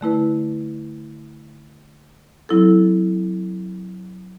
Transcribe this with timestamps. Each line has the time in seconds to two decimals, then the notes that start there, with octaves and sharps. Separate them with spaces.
0.01 D3 A3 E4 B4
2.49 F#3 C4 E4 A4